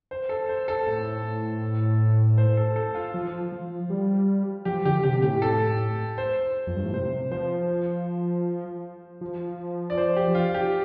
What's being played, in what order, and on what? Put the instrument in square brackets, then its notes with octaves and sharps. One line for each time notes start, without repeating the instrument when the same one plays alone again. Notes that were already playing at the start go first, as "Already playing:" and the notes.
[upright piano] C5
A4
C5
A4
[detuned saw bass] A2
[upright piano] C5
A4
A4
F4
[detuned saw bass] F3
F3
G3
[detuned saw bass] F3 [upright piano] G4
[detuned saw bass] D3 [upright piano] G4
[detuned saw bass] C3 [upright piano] G4
[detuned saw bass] A2 [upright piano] G4
[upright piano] A4
C5
[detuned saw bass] F2
G2
A2
[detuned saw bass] C3 [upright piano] C5
[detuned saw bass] F3 [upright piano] C5
[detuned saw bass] F3
[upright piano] D5
C5
G4
F4
G4